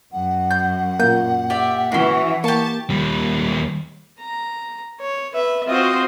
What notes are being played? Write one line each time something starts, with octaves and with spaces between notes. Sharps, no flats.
F#2 F#5
G6
A#2 A#3 G6
G4 D5 E5
E3 C#4 F#4
A#3 G4 A5 C#6
D#2 G3
A#5
C#5
B4 E5
C4 F4 F#4 C5 D#5